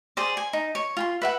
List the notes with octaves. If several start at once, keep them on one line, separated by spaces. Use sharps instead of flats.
G#4 C5 D5
G#5
D#4
C#5
F4 G#5 C6
B4 E5 F#5